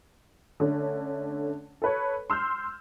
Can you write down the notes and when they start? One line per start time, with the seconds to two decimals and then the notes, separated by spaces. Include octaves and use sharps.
0.60 D3 A3 C#4
1.82 A4 B4 C#5
2.30 C6 E6 F6 G6